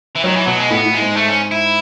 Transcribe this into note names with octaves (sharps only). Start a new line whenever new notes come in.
E3
D#3 F#3
E3
B2 F#3
G#3
A2 B3
A2
G#3
G#2
A3
C#4
E4